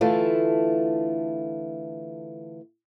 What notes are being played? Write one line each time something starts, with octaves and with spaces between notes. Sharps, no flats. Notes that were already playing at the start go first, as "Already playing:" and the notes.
D3 E3 A3 E4 F4